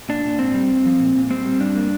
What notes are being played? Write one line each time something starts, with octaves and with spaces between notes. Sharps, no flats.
A#2 D4
A#2
G#2 C4
G3
G2
F3
A#2
A#2
G3 C4
G3
G2 D4
A#3